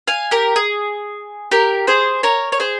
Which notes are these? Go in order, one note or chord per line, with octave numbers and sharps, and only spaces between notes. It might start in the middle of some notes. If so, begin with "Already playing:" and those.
F5 G#5
G4 A#4
G#4
G4 A#4
G#4 C5
A#4 C#5
C#5
G#4 C5